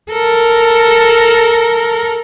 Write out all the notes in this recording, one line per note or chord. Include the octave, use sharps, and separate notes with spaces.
A4 A#4